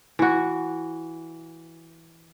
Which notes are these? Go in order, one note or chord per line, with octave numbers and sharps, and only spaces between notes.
E3 F#4